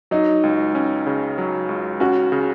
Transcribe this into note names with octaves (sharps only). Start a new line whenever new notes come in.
F#3 D#4
C#2
C#4
C#3
F#3
C#2
C#4 F#4
C#3